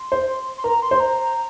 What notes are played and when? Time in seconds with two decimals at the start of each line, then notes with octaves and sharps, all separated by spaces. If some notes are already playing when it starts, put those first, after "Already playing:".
Already playing: C6
0.12 C5
0.58 C6
0.64 A#4 A#5
0.82 C6
0.91 C5
1.00 A#5